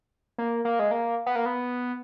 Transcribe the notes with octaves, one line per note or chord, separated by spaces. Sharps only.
A#3
A#3
G#3
A#3
B3
A#3
B3